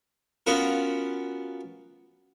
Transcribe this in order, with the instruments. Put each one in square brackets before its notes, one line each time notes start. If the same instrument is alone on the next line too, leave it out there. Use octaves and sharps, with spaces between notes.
[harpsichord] B3 C#4 F4 F#4 A#4